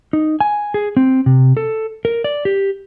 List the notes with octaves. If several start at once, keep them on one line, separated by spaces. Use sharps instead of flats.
D#4
G#5
G#4
C4
C3
A4
A#4
D5
G4